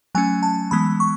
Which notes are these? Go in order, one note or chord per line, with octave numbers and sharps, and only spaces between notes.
F#3 A3 C#4 G#5
A5
E3 G#3 B3 B5
C#6